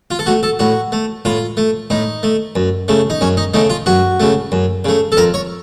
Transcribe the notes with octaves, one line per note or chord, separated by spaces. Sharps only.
F4
A4
A3 F#4
A4
A2 F#4
A3
A2 F4
A3
A2 D#4
A3
F#2
C#3 A3
D#4
F#2 C#4
D#4
C#3 A3 D#4
F4
F#2 F#4
C#3 A3
F#2
C#3 A3
A4
F2 A#4
C#5